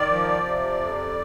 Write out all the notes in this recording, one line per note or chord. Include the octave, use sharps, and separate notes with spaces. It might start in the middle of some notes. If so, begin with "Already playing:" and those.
Already playing: D#3 D5
F3
C3
F2